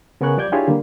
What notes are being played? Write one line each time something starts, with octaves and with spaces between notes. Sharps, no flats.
C#3 B3 A#4 G#5 C#6 F#6
F3 G3 D5 D6 G6 G#6
D4 E4 F4 G4 G#4 C#5
D3 G3 A#3